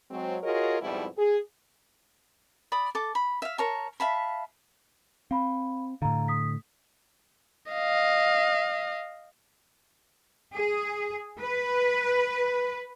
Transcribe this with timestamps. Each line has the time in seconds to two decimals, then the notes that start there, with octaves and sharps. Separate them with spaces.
0.11 F#3 G#3 C4
0.43 F4 F#4 G#4 A#4 C#5 D#5
0.80 F2 G#2 B2 G3 E4
1.17 G#4
2.72 D5 B5 D#6
2.95 A4 D6
3.15 B5
3.42 E5 F5
3.58 A#4 C#5 A5
4.00 E5 F5 A5 B5
5.31 C4 F5 B5
6.02 A2 D3 F5 A#5
6.28 D#6 B6
7.72 D#5 F5
10.54 G#4
11.41 B4